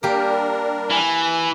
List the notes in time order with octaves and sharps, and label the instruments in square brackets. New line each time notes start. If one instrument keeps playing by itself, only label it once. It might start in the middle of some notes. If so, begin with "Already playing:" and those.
[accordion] G3 D4 A#4 [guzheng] A#3 G4
[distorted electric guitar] E3 [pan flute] G#5